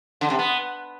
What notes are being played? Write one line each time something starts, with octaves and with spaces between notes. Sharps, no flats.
D3
C3
B3